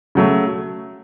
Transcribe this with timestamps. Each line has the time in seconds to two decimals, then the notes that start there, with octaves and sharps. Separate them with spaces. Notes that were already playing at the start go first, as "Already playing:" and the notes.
0.15 C#3 F#3 A3